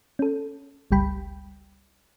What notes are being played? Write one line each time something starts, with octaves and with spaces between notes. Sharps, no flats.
C#4 A4
G1 C#2 G3 G5 B5